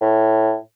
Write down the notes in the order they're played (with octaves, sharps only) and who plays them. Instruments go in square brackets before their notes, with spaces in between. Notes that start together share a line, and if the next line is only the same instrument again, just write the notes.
[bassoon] A2